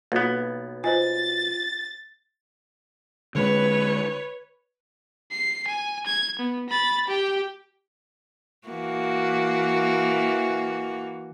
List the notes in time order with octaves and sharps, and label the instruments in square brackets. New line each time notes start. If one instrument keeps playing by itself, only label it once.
[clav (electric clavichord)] B1 B3 [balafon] A#3 F4 F#4
[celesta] F4 [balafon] C5 D#5 G#5 [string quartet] A6
[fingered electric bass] D3 G#3 [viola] B4 C#5
[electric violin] C7
G#5
G#6
B3
B5 A6
G4 G5
[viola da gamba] E3 A#3 F#4